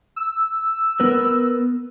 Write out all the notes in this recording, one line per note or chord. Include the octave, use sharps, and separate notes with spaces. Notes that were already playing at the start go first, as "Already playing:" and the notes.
E6
B3 A#4 B4